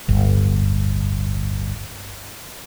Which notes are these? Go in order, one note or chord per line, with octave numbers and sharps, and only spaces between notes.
D1 G1